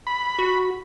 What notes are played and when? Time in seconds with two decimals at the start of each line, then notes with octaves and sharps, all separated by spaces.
0.07 B5
0.39 F#4